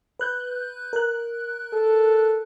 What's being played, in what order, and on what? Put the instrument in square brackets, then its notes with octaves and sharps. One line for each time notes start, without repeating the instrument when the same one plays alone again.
[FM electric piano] B4 F#6 G6
A#4 F#6
[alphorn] A4